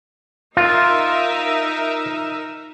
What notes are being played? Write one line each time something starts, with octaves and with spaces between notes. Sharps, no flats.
D#4 F4 A#4 E5